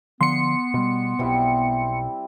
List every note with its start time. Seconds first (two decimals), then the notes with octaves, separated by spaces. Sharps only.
0.21 D3 F3 B3 C6 C#7
0.74 B2 G3
1.19 B1 B2 G3 C4 E4